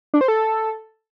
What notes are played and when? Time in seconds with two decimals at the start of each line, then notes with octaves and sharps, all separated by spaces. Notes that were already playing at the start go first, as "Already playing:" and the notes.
0.14 D4
0.21 C5
0.28 A4